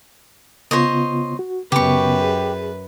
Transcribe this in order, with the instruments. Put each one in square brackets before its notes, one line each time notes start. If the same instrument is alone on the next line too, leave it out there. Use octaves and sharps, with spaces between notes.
[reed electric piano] C#3 B3 F4 [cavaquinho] C5 C#5 D#5
[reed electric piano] F#4
[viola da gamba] F#2 B4 [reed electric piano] C#3 B3 [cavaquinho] G4 C#6
[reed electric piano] G#4